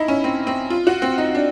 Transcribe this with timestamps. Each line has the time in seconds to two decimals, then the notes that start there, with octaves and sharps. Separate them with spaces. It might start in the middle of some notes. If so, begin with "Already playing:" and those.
Already playing: D#4 E4
0.08 C#4
0.24 C4
0.47 C4
0.70 F4
0.87 F#4
1.02 C4
1.18 D#4
1.35 D4